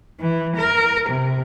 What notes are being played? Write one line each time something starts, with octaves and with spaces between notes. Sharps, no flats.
E3
A#4
C3